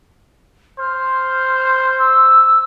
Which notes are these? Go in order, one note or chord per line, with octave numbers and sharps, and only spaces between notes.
C5 F6
E6